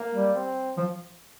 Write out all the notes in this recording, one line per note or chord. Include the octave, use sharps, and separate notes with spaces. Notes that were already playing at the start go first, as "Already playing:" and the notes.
Already playing: A#3
G3
C4
F3